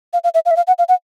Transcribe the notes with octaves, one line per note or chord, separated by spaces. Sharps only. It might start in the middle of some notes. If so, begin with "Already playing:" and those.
F5
F5
E5
F5
E5
F5
F#5
F5
F#5